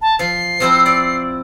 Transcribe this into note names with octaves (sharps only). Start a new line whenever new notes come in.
A5
F3 C7
F3 C4 E4
D5